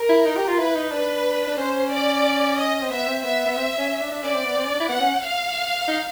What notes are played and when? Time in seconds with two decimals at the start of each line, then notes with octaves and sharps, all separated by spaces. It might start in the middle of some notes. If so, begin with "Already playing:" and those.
Already playing: A#4
0.09 E4
0.26 D#4
0.37 G4
0.48 F4
0.59 E4 B4
0.75 D#4
0.92 D4 B4
1.47 D4
1.58 C#4 C5
1.91 D5
2.57 D#5
2.82 C4
2.90 B3 E5
3.07 C4
3.23 B3 E5
3.46 B3
3.56 C4
3.78 C#4
3.89 C#4
4.01 D4
4.12 D4
4.22 C#4 D5
4.34 C4
4.45 B3
4.56 C4
4.65 C#4
4.72 D4
4.80 E4
4.89 B3 F#5
5.00 C#4
5.22 F5
5.88 D#4